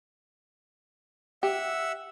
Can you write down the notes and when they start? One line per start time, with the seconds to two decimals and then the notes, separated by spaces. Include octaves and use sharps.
1.43 G4 E5 F#5 E6